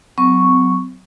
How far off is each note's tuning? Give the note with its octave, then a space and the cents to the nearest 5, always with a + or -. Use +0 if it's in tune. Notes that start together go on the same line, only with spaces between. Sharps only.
F#3 +0 C4 -45 C#6 +0